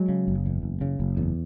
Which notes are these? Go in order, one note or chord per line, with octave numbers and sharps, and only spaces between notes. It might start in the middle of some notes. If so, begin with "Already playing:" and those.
Already playing: F#3 G#3
C#3
F#1
E2
F#1
C#3
F#1
E2